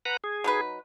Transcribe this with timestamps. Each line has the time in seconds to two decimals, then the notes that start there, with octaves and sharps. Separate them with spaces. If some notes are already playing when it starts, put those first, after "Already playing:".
0.05 B4 F#5 A#5
0.24 G#4
0.44 F#3 D#4 B4